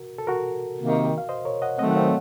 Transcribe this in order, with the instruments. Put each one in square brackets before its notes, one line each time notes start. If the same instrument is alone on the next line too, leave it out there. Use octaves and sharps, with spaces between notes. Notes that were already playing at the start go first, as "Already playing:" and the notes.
Already playing: [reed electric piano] F#4 A#4
A4
F#4 A#4
[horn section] C3 D#3 A#3
[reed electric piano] F5
C5 D#5
A#4 C#5
D#5 F#5
[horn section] D#3 F#3 A3 C4 [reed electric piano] D#5 F#5
[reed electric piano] F#5
C#5 F5